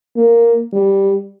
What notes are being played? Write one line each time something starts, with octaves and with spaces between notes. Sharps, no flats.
A#3
G3